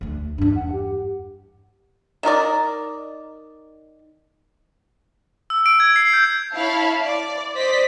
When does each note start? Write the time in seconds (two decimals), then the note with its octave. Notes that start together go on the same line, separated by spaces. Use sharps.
0.01 D2 D3
0.38 E2 G2 D4
0.55 F#5
0.72 G4
2.23 D#3 D#4 A#4 D5
5.50 E6
5.66 D7
5.80 G#6
5.96 C7
6.13 G6
6.55 E4 C#5 F5 A5 B5
7.04 D5
7.54 C5 D5 D#5 B6